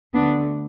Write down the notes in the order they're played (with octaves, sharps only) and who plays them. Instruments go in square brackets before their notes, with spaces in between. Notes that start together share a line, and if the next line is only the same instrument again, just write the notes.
[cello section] D2 D3 A3 B3 D4